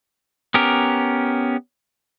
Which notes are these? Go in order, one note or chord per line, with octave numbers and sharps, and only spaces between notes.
B3 C#4 G4 A#4